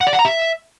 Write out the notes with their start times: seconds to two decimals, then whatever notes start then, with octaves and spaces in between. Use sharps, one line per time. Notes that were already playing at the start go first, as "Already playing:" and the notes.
0.01 F#5
0.07 D5
0.13 F#5
0.19 A#5
0.25 E5